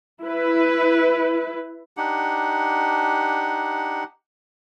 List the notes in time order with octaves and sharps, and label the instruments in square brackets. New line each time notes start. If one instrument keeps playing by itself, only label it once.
[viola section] E4 B4
[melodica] D4 D#4 G4 F#5